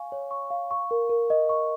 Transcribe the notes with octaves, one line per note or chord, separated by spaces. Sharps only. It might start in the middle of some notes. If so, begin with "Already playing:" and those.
Already playing: F5 G#5 C#6
C#5
C#6
F5
C#6
A#4
A#4
D#5
C#6